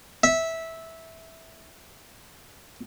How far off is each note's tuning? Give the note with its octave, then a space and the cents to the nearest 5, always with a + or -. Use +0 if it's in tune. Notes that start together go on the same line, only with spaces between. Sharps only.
E5 -15